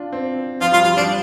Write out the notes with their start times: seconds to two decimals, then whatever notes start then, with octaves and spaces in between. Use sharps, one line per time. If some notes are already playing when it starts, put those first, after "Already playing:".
Already playing: D4 F4
0.13 C4
0.61 F3 F4
0.72 G3 F4
0.84 G3 F4
0.97 F3 D4